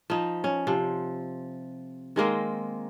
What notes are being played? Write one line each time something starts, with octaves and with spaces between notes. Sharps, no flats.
F3 D#4
C#4
C3 F3
D#3 G#3 A#3 C4